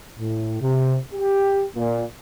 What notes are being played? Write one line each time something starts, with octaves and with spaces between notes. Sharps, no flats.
A2
C3
G4
A#2